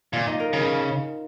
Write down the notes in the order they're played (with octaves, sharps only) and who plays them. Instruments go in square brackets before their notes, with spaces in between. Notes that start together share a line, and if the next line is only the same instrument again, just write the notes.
[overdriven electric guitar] A#2 [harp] F4 F5
[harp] D#4 D#5
A#4
[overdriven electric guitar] C#3 [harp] A#4